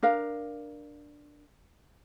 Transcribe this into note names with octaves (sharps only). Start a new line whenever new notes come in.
D4 A#4 F5